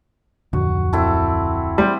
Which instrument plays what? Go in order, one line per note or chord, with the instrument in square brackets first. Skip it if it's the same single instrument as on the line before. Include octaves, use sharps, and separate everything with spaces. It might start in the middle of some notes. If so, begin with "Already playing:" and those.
[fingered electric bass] D1 F2 D3 [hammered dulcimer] F#4
[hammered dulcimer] C4 E4 A4
[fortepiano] G3 [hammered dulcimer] C5